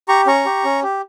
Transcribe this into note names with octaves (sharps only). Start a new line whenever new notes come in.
G4 A#5 C#6
C#4 A#5 C#6
G4
C#4
G4